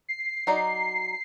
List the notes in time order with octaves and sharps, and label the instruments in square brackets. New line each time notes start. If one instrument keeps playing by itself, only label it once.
[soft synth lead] C7
[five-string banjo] F#3 D#4 D5